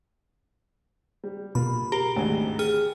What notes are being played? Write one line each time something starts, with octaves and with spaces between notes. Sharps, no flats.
G3
B2 A#3 F4 B5
G4 A#4 A#5
G#1 D2 G#5
G#4 G5 F6